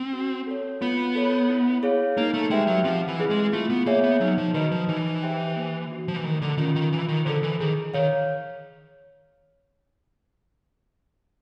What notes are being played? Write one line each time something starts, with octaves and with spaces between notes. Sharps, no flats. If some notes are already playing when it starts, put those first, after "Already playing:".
Already playing: C4
F#4
A4 C#5
B3 F4
A4 C#5
E4
G#4 C#5 F5
A#3 D#4
A3
G#3 G4 B4 E5 G5
F#3
F3 C4
E3
E4 G#4 B4
G#3
A3 F4
B3
A#3 G#4 C#5 E5 G#5
B3
F#3 D#4
F3
D#3 F#4 B4 D#5
F3
E3 D#4
G4 C5 E5 G5
A#3
D4 F#4
F3
E3
D#3 A3
D3
D#3 C#4 F4
D#3
E3 F4
D#3
D3 A4 C5
E3
D#3 G#4
D#3 C#5 F5